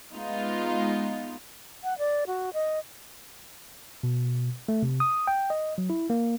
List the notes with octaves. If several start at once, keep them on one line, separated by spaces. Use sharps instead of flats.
G#3 B3 D#4 F4
F#5
D5
F#4
D#5
B2
A3
C3
D#6
G5
D#5
F#3
E4
A#3